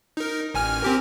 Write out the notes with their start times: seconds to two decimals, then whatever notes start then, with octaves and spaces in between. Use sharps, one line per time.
0.17 D#4 A#4
0.54 A1 G#5 F6
0.82 C4 G4 A#4